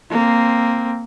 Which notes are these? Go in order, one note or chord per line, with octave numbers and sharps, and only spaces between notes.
A#3 C4